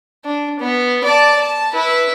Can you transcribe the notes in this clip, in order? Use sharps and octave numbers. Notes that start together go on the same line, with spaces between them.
D4
B3
D5 A5
A5
E4 B4